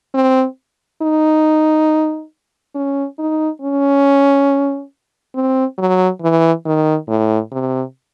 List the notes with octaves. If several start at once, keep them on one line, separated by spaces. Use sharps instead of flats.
C4
D#4
C#4
D#4
C#4
C4
F#3
E3
D#3
A2
C3